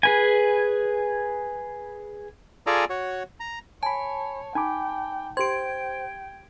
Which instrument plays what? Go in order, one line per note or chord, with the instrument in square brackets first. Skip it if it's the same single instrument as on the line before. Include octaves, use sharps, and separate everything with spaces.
[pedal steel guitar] G#4 B4 G#5
[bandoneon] F4 G#4 A4 D5 G#5 A#5
F#4 C#5
A#5
[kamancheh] C#5 [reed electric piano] G#5 B5 [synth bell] A5
[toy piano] D#4 [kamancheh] G5 [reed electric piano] G#5 B5 D6
[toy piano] G4 C6 [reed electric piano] C5 [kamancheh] G5 [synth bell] G#6 D7